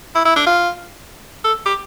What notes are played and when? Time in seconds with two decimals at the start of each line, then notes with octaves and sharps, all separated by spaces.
0.15 E4
0.25 E4
0.36 D4
0.47 F4
1.44 A4
1.66 G4